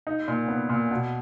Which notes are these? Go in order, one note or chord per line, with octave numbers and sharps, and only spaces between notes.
D#4
A#2
B3
A#2
B2